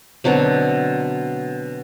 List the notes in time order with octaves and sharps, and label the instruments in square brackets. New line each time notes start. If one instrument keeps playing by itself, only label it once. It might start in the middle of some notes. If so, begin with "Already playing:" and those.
[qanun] B2 D3 F#3 C4